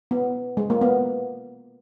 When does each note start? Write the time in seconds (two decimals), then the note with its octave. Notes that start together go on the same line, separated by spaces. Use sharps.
0.11 B3
0.57 G#3
0.70 A#3
0.81 B3